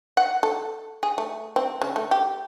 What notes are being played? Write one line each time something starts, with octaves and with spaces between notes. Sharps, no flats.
F#5
A4
G#4
A3
C4
C#3
A3
G4